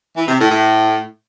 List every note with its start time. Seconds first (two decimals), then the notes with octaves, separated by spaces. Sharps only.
0.17 E3
0.28 C3
0.39 A2
0.51 A2